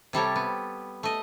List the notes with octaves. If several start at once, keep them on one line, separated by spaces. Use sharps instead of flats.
C3 G3 A4 C#5
B3
A3 D#5